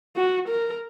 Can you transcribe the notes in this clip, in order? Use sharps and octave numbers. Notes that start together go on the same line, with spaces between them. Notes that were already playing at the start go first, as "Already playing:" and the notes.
F#4
A#4